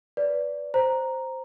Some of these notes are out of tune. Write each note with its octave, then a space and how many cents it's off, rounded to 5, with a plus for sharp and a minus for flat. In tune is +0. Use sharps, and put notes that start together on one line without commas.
B4 +0 D5 -15
C5 +0 A#5 +0